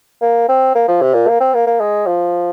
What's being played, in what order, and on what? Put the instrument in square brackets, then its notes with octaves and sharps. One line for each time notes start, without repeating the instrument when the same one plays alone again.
[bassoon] A#3
C4
A#3
F3
C3
A#2
A#3
C4
A#3
A#3
G#3
F3